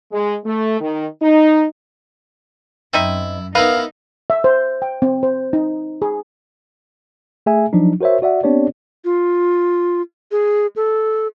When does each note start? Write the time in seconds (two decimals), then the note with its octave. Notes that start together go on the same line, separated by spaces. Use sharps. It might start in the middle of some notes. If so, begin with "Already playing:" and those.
0.12 G#3
0.45 A3
0.80 D#3
1.21 D#4
2.93 F#2 C4 D#4 E4 E5
3.55 B3 D#4 E4 A#4 B4 F5
4.30 E5
4.44 C5
4.82 G5
5.02 C4
5.23 C5
5.53 D#4
6.02 G#4
7.46 A3 G#4 E5 G#5
7.73 F3 F#3 D4 D#4
8.01 F#4 A#4 C5 C#5 E5
8.22 F#4 D5 E5 F#5
8.43 B3 C4 D4 G4 C#5 D5
9.05 F4
10.32 G#4
10.76 A4